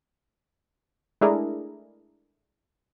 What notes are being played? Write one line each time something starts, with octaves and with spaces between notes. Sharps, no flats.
G#3 A3 D4 E4 G#4 A#4